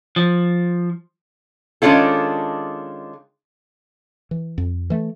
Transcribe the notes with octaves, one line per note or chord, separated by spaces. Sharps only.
F3
D#3 G#3 C#4 D4 F4 A4
E3
F2
E3 A3